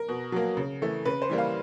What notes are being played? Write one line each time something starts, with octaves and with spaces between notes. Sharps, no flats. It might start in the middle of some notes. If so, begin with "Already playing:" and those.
Already playing: A#4
B2
F#3 A#3
C#3
E3 A3
C#3 B4
C5
E3 G3 A#3
F5